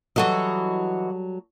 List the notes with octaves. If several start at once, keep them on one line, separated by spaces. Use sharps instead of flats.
E3 F#3 G3 F#4 A4 D#5